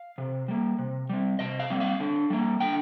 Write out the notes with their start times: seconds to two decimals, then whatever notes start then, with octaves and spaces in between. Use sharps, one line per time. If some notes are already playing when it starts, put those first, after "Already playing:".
Already playing: F5
0.18 C3
0.48 G3 A#3
0.79 C3
1.10 G3 C4
1.39 C3 D#5
1.59 F5
1.70 G3 C4
1.80 F5
2.00 D3
2.30 G3 A#3
2.60 D3 G5